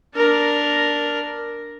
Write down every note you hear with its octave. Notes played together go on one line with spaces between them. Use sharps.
D4 A#4